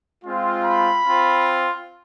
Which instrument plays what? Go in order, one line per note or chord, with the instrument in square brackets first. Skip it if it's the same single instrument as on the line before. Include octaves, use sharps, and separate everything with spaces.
[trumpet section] G#3 C4 F4
B5
C4 F4